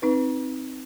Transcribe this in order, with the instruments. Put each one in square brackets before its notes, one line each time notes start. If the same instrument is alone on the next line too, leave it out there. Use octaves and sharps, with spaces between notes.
[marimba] C4 D#4 B4